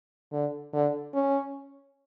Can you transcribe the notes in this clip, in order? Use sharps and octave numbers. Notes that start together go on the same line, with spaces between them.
D3
D3
C#4